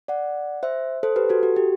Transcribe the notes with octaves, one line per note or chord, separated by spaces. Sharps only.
D5 F#5
C5 E5
A4 C5
G4 B4
F#4 A4
F#4
G4